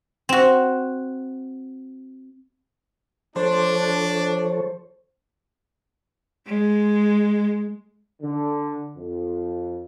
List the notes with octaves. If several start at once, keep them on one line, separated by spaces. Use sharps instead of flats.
C4 F#4
F3 D4 A4 C5 C#5
G#3
D3
F2